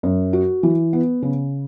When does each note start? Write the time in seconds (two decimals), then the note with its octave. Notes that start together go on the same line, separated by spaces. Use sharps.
0.03 F#2
0.33 F#4
0.63 E3
0.93 B3
1.22 C#3